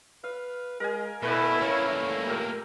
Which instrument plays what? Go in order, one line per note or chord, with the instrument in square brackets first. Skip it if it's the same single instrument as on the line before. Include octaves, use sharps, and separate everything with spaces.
[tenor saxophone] B4 [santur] F5
[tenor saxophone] G#3 [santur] A#4 G#5
[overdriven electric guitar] B2 [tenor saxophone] A3 [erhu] E4 [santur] A#4 B4 D5
[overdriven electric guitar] A3 A#3 [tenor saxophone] C#4
[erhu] E4
[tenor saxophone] A#2 [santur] G4 A#4